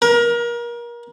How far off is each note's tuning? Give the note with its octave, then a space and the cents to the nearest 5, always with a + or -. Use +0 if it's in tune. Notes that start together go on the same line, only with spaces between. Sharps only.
A#4 +30